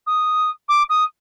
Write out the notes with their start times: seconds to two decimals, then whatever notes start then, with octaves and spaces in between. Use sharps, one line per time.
0.07 D#6
0.69 D6
0.89 D#6